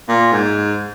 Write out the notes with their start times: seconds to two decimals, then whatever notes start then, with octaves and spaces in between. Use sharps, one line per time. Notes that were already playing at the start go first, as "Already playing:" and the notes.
0.09 A#2
0.32 G#2